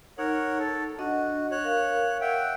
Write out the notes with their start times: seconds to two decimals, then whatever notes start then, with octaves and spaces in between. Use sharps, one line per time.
0.18 D#4 A#4 C#5 F#5
0.59 A4
0.99 D4 F#4 D#5 F#5
1.51 C#5 F#6
1.64 A#4 F5
2.21 E5 F#5 G5